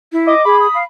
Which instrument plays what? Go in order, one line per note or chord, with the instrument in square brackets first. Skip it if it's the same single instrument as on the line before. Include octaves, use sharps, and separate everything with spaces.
[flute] E4
[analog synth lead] D#5 [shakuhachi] D6
[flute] G#4 [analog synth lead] B5
[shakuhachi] D#6
[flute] F5